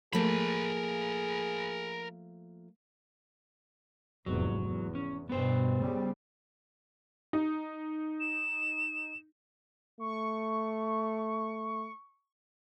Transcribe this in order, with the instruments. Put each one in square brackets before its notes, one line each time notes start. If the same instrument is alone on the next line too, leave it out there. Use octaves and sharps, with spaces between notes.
[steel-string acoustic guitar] F3 A3 A#3 [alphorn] G#4 [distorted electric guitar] A#4 B5
[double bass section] F1 E2 G#2 [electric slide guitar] F#3
[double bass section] E2
[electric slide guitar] C#4
[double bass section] G2 B2 [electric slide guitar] B3 C5
[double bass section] C#3 G3
[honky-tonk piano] D#4
[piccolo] E7
[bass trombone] A3 [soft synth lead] C#6